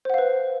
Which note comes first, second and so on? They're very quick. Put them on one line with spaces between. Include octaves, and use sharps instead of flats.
C5 F#5 F5 B4